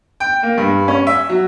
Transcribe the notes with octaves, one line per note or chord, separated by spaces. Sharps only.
G5
A#3
G2
C#4
E5
F#3